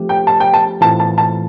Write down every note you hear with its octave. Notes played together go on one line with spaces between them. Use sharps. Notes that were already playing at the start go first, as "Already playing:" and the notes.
Already playing: F3 A3 C4 G4
G5
A5
G5
A5
A2 E3 A3 C4 F4 A5
A5
A5